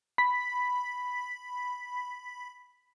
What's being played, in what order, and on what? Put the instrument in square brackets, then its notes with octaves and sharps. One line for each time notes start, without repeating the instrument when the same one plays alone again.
[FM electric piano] B5 B6